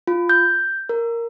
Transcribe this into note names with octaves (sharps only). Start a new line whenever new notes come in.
F4
G6
A#4